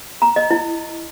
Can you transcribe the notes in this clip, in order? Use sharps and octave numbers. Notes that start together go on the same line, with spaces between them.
A#5
D#5
E4